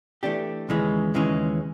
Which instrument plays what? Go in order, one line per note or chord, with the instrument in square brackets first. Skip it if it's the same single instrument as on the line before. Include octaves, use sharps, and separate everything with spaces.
[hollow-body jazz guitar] E3 A3 D4 G4
D#2 C#3 E3 G#3 C#4
D#2 C#3 E3 G#3 C#4